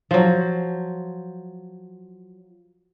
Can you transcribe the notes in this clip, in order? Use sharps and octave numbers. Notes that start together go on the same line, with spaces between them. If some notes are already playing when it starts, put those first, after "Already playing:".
F3 F#3